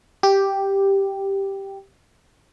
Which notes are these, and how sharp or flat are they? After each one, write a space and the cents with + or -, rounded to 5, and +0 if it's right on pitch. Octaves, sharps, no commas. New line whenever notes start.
G4 +0